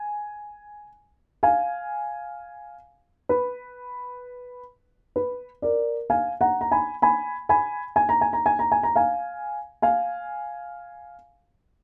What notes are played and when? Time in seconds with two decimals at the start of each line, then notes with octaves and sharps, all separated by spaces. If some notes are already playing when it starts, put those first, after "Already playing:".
Already playing: G#5
1.43 F5 G#5
3.29 B4
5.16 B4
5.62 A#4 D5
6.10 F5 G#5
6.41 F#5 A#5
6.61 A#5
6.71 G#5 B5
7.02 G#5 B5
7.49 G#5 B5
7.96 G#5
8.09 A#5
8.21 G#5
8.33 A#5
8.46 G#5
8.59 A#5
8.72 G#5
8.83 A#5
8.95 F5 G#5
9.82 F5 G#5